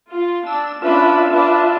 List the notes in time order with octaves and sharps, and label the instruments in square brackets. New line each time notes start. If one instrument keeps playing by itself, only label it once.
[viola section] F4
[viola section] D4 [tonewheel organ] E6
[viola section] C#4 D4 B4 [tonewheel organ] F4 E5
[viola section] D4 B4